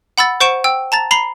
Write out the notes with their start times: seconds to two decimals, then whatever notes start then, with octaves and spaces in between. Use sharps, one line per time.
0.18 F#5 B5 E6 A6
0.40 C5 F#5 C#6 D7 E7
0.64 G5 E6
0.92 A5 A#5 A6
1.11 A#5 B5 C7 G7